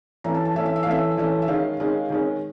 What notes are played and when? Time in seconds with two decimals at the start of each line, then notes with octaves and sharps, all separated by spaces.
0.24 E3 A3 C#4 A#5
0.34 A5
0.45 A5
0.55 E3 A3 C#4 E5
0.66 E5
0.76 E5
0.83 F5
0.86 E3 A3 C#4 E5
1.17 E3 A3 C#4
1.42 E5
1.48 D#3 G#3 C#4 F5
1.80 D#3 G#3 C#4
2.10 D#3 G#3 C#4